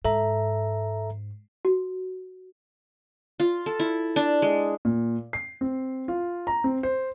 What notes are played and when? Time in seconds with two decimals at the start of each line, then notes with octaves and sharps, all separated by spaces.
0.05 G#2 A4 E5 A#5
1.65 F#4
3.40 F4
3.66 A4
3.80 E4
4.16 D4
4.42 G#3
4.85 A#2
5.33 C7
5.61 C4
6.08 F4
6.47 A#5
6.64 C4
6.83 C5